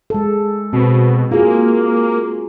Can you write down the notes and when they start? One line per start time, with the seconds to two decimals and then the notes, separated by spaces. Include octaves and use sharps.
0.10 G#3 A4
0.73 B2 C4
1.31 A#3 F4 F#4 G#4